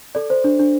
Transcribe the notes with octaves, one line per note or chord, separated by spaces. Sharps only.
A4 D5
C5
D4
D4